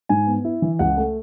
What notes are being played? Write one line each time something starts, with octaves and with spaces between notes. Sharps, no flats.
G#2 G#5
B3
E4
E3
C#2 F#5
A3